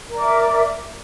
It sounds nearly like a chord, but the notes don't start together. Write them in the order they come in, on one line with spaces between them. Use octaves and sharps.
A#4 D5 D6 E5